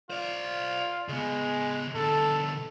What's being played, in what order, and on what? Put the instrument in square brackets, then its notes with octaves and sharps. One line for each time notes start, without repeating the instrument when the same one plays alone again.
[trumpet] F4 [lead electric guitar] C5 D5
[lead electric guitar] C#3 B3 [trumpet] G#3
[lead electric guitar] B2 D3 [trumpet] A4